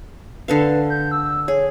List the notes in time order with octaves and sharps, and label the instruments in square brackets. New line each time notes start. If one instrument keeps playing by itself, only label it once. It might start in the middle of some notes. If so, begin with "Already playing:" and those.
[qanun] D3 A4 F5 [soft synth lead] B4
[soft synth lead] G6
E6
[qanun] G#4 [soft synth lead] C#5